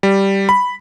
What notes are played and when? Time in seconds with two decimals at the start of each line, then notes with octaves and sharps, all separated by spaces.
0.03 G3
0.49 B5